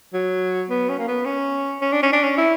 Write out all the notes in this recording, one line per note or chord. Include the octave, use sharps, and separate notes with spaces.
F#3
B3
C#4
A#3
B3
C#4
C#4
D4
C#4
D4
C#4
E4